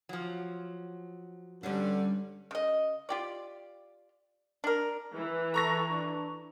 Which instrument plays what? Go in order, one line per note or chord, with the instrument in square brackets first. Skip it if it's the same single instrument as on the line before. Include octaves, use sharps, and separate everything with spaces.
[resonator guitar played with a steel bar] F3 F#3
[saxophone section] G2 D3 [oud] G3 C#4 D4
[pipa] C#3 D#5
F4 G4 D5
D4 A#4
[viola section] E3
[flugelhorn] A4 [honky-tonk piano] A#5 C#6 A#6
[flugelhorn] D4